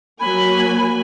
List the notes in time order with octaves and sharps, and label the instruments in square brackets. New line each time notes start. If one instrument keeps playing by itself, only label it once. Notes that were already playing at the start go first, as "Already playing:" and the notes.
[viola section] F#3 A#3 G#5 [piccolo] B5